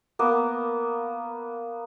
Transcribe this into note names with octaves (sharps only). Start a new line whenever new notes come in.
A#3 B3